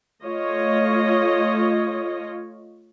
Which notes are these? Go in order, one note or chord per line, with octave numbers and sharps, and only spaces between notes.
A3 F4 C#5 D#5